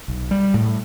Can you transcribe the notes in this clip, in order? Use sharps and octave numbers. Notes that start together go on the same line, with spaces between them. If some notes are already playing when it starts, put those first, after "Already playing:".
B1
G3
A2